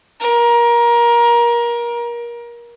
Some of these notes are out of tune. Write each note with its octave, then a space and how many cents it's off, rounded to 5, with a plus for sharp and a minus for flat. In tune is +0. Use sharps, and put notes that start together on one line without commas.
A#4 +25